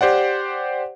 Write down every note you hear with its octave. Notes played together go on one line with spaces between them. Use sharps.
G4 C5 D5 F#5